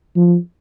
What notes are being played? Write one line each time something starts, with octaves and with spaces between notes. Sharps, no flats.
F3